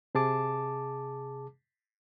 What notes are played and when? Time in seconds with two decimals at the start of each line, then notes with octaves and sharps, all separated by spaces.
0.15 C3 G#4 A5 D6